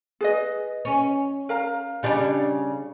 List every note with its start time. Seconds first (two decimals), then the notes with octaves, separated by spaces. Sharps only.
0.21 G#4 B4 D#5
0.85 C#4
1.49 A#4 F5 A#5
2.03 C#3 G3 D4